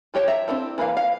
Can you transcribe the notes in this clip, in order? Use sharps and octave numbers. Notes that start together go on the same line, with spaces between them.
F3 G4 C#5 G5 A5
E5 A#5
C4 D4 E4 A4
E3 A#3 B4 F5
F5